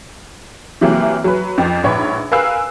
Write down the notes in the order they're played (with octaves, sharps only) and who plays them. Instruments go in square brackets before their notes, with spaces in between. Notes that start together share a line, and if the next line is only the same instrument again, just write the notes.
[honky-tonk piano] C3 E3 F#3 A#3
F#3 B4
F2 F3
A#1 G#2 B4 C#5 B5
A#4 B4 F5 G#5 E6 F#6